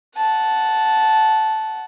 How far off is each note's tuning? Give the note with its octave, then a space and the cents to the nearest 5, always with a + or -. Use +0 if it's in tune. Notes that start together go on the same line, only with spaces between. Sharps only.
F#5 +0 A5 -10